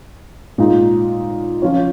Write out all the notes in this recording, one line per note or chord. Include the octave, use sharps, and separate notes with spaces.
A#2 G#3 D#4
F3 C#4 F4 C#5